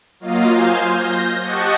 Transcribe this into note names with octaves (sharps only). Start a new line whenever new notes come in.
F#3 A#3 F4 D#5 F5
C5 F5 G#5 G6
G6 A#6
G4 D#5 F#5 A5 C#6